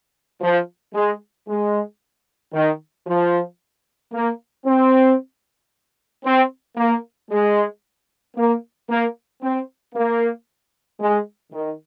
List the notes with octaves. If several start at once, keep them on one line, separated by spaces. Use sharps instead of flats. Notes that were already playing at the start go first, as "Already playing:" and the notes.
F3
G#3
G#3
D#3
F3
A#3
C4
C4
A#3
G#3
A#3
A#3
C4
A#3
G#3
D#3